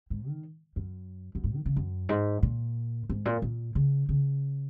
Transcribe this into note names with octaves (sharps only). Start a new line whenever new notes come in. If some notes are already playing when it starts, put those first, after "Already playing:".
G#2
D#3
F#2
F#2
G#2
D#3
C#3
F#2
G#2
A#2
G#2
A#2
A#2
C#3
C#3